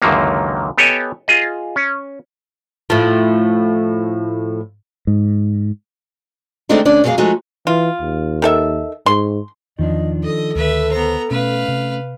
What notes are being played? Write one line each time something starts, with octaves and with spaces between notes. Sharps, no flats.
C#2 F#2 D3 D#3 F#3 A#3
B3 G4 A4 C#5 D#5 G#5
F4 G#4 D#5
C#4
A2 F3
G#2
D#3 G#3 A3 C4 D4 D#4
D2 C#4 D4 D5
F#2 F#3 G#3 A#3 G#4 F5
F3 G#3 A3 D#4 F#4
E3 F4
D#2
D#3 A4 E5
G#2 C6
E2 D#3 F3 D4 D#5
A4 D#5
D2 D#3 B4 E5
B3 C5 A#5
B2 A3 C#4 B4 F5
C3